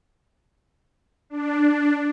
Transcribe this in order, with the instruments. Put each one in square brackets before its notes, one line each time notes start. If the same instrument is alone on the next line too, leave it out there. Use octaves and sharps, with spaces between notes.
[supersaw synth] D4